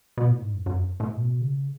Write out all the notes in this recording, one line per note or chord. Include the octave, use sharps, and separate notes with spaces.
B2
A2
G#2
F#2
F#2
A2
B2
C#3